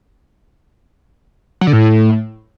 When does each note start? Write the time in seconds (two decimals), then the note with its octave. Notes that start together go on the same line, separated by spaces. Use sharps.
1.61 F#3
1.67 D3
1.73 A2